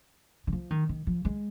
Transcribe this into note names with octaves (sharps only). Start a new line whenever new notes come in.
D#3
F3
D#3
D#3
F3
G#3